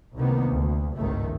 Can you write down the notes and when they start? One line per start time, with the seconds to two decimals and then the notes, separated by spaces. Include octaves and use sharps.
0.17 C2 C3 D#3 A#3 B3
0.52 D2
0.97 G#1 C#2 G2 D#3 A3